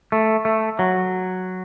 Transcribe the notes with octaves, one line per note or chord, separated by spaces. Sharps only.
A3
A3
F#3